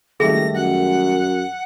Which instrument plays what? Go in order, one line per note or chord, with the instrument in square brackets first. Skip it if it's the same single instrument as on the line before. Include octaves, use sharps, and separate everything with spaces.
[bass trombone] F#1 [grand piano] D#3 G3 A3 [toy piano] G#4 [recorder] A#6
[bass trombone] F#2 [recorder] F#5